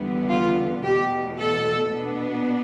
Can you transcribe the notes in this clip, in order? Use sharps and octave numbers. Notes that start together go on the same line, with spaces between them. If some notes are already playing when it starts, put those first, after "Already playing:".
Already playing: E2 D3 G3 B3
F4
E2 B2 A3 G4
A4
B2 B3 D4